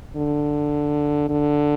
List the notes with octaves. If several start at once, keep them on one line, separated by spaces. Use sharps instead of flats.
D3
D3